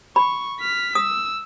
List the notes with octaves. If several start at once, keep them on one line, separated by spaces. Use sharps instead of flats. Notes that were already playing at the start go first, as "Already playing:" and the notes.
B5 C#6
F6 B6
D#6 E6